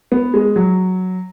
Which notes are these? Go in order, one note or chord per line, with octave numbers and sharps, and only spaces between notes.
B3
G#3
F#3